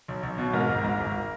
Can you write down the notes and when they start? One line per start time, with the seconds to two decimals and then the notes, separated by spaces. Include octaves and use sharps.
0.08 B1
0.23 B1
0.38 B2
0.54 G#2 A#4
0.69 G#1
0.84 G#2
1.00 G#1